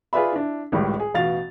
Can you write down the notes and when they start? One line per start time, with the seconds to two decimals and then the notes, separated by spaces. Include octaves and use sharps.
0.13 F4 G#4 B4 D5 E5 B5
0.32 D4 E4
0.72 G#1 C#2 A2 G3
1.00 G#4
1.14 A1 B2 F5 A6 F7